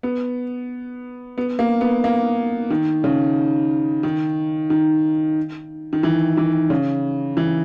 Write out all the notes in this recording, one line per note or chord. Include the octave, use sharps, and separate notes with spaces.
B3
B3
A#3
B3
A#3
D#3
C#3
D#3
D#3
D#3
E3
E3
C#3
E3